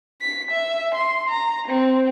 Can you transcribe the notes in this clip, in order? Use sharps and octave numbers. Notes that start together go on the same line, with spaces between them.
B6
E5
C6
A#5
C4